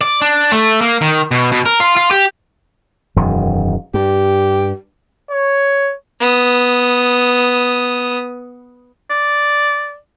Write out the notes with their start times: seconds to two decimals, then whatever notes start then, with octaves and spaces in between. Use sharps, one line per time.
0.01 D5
0.21 D4
0.52 A3
0.81 A#3
1.01 D#3
1.31 B2
1.52 B2
1.66 A#4
1.80 F4
1.96 F4
2.11 G4
3.16 E1 F#2 D#3
3.94 G2 G4
5.31 C#5
6.20 B3 D#6
9.10 D5